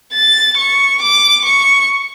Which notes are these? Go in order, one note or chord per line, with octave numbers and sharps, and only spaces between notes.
A6
C#6
D6
C#6